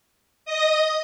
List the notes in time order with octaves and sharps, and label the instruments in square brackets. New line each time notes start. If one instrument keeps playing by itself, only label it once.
[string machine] D#5 D#6